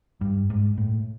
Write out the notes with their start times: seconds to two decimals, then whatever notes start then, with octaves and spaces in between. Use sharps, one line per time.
0.21 G2
0.50 G#2
0.78 A2